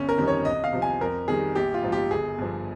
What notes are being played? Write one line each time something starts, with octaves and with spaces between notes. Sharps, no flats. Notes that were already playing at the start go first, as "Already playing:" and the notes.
Already playing: G1 C#4
A#4
F2 D#3 G3
C#5
C2 D#5
F5
C3 F3
G#5
F2 A#4
D#3 G3 G#4
A#1 G4
F4
G#2 F3
G4
G1 G#4
G2 F3